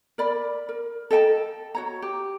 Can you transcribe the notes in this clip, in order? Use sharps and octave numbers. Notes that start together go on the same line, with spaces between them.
A#4 D5 B5
A#4
A4 D#5 G5 A5
F#4 C#5 A#5
G4